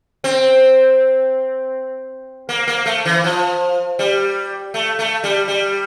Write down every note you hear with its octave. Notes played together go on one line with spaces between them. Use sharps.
C4
A#3
A#3
A3
E3
F3
G3
A3
A3
G3
G3